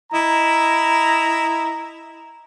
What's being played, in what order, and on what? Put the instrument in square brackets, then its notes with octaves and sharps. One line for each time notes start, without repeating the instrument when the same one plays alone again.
[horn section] E4 D#5 A#5